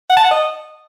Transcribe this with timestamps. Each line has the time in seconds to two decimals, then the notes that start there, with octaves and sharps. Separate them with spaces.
0.09 F#5
0.17 A5
0.24 F#5
0.31 D#5